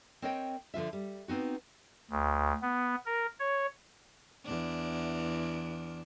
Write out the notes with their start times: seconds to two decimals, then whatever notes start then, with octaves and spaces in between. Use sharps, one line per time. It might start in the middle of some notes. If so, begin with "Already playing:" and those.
0.22 C4 A#4 C#5 D#5 G5
0.74 D3 F3 F4 E5
0.93 G3
1.28 B3 C4 D#4 F#4
2.10 D2
2.62 B3
3.06 A#4
3.40 C#5
4.46 E2 D4